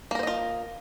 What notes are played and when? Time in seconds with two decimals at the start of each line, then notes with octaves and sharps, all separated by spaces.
0.11 A#3
0.15 A#4
0.19 C5
0.23 D#5
0.27 F4